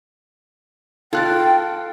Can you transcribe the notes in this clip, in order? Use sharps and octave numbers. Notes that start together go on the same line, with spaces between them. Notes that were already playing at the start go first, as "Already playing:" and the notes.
F4 A4 G5 F#6 A6